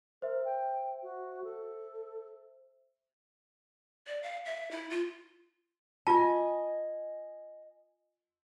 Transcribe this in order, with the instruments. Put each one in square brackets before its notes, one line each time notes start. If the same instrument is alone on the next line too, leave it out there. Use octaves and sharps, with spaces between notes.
[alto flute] A#4 [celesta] C5 E5
[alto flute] G5
F#4
A4
[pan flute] D5
F5
E5
E4
F4
[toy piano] F4 A5 [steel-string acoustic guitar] D#5 G#5